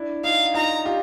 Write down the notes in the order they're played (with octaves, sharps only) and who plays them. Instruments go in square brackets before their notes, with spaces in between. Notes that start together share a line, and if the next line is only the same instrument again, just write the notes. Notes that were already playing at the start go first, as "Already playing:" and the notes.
Already playing: [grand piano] D4 E4
[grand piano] D#4 F4 [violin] F5
[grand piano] D#4 F4 [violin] A#5
[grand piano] F4 G4